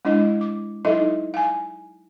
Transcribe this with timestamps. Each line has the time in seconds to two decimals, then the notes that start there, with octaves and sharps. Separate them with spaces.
0.05 G#3 D4 E4 D#5
0.41 D6
0.85 F#3 D#4 E4 A4 D#5 E5
1.34 F5 G#5